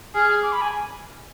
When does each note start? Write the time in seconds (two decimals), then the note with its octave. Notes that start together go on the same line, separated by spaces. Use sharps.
0.15 G#4 F6
0.43 D6
0.52 B5
0.61 G#5